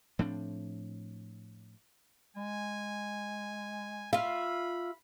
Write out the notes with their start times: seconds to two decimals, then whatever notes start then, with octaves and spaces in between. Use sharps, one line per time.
0.19 A2 F3 C4 D4
2.37 G#3 G#5
4.13 F4 E5 F5 B5